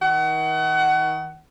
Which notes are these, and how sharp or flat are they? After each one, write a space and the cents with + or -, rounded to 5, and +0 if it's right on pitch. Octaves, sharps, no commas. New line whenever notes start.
D#3 +35 F#5 +30